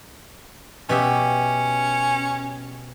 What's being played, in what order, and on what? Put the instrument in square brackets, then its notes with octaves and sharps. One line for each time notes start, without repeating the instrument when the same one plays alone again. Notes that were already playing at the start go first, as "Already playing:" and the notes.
[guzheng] B2 G4 E5 [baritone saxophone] C#4